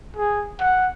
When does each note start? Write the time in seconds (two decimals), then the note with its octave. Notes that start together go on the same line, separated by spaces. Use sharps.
0.17 G#4
0.60 F#5